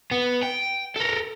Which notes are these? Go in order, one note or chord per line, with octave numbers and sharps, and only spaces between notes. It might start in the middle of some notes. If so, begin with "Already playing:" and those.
B3
G5
A4 A#4